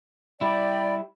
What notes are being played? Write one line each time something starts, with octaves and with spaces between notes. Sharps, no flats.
G3 E4 D5 G5 B5